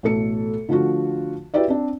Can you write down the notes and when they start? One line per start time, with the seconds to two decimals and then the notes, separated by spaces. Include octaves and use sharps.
0.03 A1 B2 A3 A4 C#7
0.69 D3 F3 A3 F4 F#4
1.54 E4 F#4 G4 B4 D5 E5
1.68 C4 D4